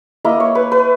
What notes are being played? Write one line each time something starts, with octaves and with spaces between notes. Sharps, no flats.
A#3 E4 D#5
C#5
B4
B4